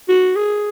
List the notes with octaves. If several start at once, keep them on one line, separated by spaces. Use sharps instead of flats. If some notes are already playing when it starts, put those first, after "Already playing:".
F#4
G#4